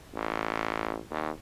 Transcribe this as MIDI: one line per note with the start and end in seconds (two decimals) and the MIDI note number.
0.15 0.98 33
1.11 1.30 39